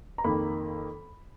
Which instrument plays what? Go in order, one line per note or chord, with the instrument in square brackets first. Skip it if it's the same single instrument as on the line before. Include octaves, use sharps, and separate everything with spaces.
[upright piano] A#5
F2 D#3 A#3 B5